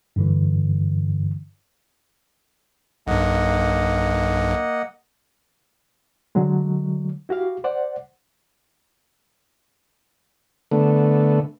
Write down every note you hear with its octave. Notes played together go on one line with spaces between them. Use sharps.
G2 D3 E3
B1 G2 A#3 D#5 F#5
D3 F#3 G#3
E4 F#4 G4 F5
C5 D5 F#5
D3 A3 B3